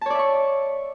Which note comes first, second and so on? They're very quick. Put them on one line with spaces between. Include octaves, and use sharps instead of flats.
A5 C#5 D5 E5 C#6